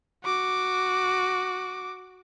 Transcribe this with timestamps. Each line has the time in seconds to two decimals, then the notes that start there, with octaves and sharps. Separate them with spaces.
0.24 F#4 D6